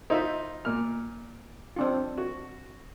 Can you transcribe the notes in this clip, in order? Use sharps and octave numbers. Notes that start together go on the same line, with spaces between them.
D#4 F4 C5 E5
A#2 F6
C4 D4 F4
F#4